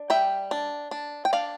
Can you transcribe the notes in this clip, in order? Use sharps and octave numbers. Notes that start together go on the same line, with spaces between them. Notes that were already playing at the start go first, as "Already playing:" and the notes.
Already playing: D4
G3 E5 G5
D4
D4
G5
D4 D5 F5